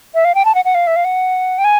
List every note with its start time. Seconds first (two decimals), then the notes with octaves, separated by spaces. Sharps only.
0.15 E5
0.25 F5
0.35 G5
0.45 A5
0.55 F#5
0.65 F#5
0.75 F5
0.87 E5
0.96 F5
1.05 F#5
1.58 G5
1.64 G#5